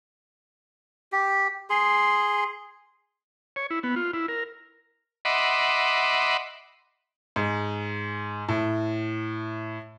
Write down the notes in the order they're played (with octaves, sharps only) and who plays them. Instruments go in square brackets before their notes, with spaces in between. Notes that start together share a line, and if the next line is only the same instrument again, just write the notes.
[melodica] G4
G#4 C6
[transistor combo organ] C#5
E4
B3
F4
E4
A#4
D#5 E5 F#5 B5 C6 D6
[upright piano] G#2
A2